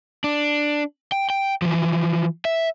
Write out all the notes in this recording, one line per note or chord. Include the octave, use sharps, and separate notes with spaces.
D4
G5
G5
E3 F3
E5